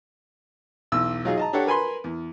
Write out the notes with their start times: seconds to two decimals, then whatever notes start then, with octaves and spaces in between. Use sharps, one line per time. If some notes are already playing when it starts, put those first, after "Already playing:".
0.92 B1 E2 E6
1.25 F#3 D#4 F4 G#4
1.37 D#5 A5 A#5
1.53 D4 G4 A4 C#5 F#5
1.66 A#4 B4 G#5 B5 C6
2.04 E2